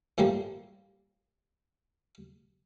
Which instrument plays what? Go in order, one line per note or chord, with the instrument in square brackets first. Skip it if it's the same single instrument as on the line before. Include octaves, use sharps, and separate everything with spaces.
[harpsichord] A2 F3 G3 A#3